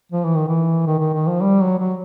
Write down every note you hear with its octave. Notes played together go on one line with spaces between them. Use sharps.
F3
E3
D#3
E3
D#3
D#3
D#3
F3
G3
F#3
F#3